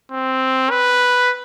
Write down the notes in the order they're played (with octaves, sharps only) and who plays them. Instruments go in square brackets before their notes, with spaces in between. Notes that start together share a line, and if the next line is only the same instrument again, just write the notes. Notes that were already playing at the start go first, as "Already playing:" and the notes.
[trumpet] C4
B4